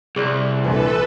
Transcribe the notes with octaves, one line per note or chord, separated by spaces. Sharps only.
C2 G#4 D5
A#1 A#2 E3 D4 A4 B4